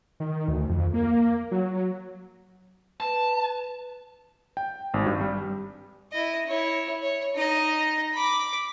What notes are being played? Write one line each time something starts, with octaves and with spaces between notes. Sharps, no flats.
D#3
D2
F2
A#3
F#3
B4 A5
G5
G#1
G2
G3
E4 D#5
E4 C#5
C#5
D#4 D#5
B5 D6